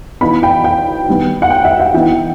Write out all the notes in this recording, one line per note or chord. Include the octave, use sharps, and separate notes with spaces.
E3 B3 D#4 B5
G5
G5
D#3 G3 B3
F#5
G5
E5
F#5
E3 B3 D#4 G5